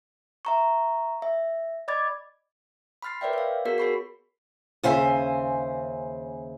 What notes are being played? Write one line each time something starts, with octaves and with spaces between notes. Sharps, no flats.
E5 A#5 C#6
E5
D5 D#5 B5 D6 G#6 A6
B5 C6 F6 A6 C7
A#4 B4 C#5 D5 E5 G5
C#5 F5
B3 F#4 G#4 A#4 B6
F#4 G#4 C#5 B5 C#6 C7
D#2 C#3 C5 E5 G#5